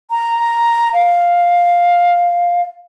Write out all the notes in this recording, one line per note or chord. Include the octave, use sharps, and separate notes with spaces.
A#5
F5